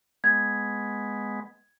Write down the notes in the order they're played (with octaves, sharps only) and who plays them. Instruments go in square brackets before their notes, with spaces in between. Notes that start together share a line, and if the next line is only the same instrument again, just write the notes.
[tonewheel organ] G#3 B3 [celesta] G#6